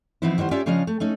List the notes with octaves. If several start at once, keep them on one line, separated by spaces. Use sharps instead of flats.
E3 F3 B3 C4 D#4 E4
D#3 G3 B3 C5
C#4 F4 G4 D5 E5 G5
C#3 F3 C#4 D4 D#5 F5
A3
A3 C#4 D#4